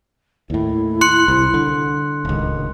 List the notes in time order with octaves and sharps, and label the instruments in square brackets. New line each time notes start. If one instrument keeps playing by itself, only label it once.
[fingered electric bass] D#2 A2 [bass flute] E4
[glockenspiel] C6 F#6 C#7
[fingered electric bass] C2
D3
[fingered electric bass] D1 C#2 [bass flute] D#3